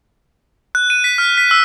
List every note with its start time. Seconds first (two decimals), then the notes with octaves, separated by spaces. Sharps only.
0.75 F#6
0.90 D#7
1.04 B6
1.18 F6
1.38 B6
1.51 E6